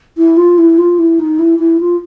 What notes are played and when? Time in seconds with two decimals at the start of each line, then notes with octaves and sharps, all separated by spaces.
0.18 E4
0.37 F4
0.58 E4
0.78 F4
0.99 E4
1.19 D#4
1.39 E4
1.59 E4
1.81 F4